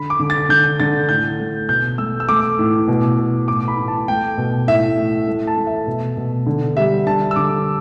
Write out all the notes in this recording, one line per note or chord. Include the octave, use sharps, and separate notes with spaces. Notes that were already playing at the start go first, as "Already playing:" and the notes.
Already playing: D3 B5
D6
D3
A6
D3 G6
D3 A6
A2 G6
A3
B2 G6
A3 E6
E6
A3 D6
A2
B2
B2
A2 D6
B5
A2
A5
A3 G5
B2
A2 E5
A2
A3
A5
A3
E5
B2
B2
D3
G3 E5
D3 A5
E6
D3 D6